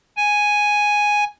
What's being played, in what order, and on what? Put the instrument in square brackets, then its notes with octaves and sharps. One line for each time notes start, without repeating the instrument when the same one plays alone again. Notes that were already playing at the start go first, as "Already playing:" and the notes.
[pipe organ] G#5